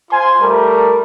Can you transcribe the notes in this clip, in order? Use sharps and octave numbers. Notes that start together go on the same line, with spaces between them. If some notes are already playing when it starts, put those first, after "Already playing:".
F4 C5 G#5 C6
G3 A3 A#4